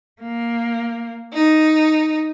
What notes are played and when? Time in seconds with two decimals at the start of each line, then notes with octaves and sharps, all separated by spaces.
0.22 A#3
1.34 D#4